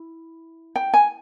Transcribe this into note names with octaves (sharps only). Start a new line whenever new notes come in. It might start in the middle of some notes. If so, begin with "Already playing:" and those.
Already playing: E4
G5
G#5